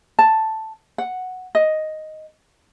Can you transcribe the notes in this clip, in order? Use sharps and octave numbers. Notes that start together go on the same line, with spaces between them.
A5
F#5
D#5